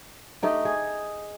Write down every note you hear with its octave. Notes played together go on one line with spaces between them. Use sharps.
A3 D#4 G4
G#4